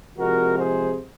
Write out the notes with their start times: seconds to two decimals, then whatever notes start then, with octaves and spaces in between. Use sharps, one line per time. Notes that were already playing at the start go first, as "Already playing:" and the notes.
0.18 C3 F3 G#3 F#4 A#4
0.57 G#4 C5